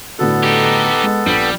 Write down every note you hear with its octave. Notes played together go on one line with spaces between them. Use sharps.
A2 D3 B3 F#4 A4
D#4 G4
G#3
A#1 G3